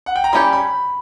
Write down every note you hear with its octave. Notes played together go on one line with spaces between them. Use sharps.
F#5
G5
A#5
G3 C#4 G4 C#5 B5
B5